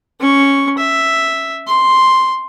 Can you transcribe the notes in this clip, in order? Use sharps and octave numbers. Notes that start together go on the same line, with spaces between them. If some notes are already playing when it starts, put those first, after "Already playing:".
C#4 C#6
E5
C6